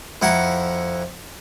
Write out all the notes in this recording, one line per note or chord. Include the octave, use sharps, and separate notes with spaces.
F2 E4 F#5 A#5